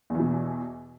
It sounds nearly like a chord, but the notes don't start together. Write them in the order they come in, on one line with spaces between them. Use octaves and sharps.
E2 E3 B2